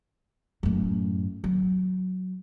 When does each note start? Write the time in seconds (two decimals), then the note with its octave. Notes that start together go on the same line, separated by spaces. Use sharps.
0.63 F#2 A2
1.44 F#3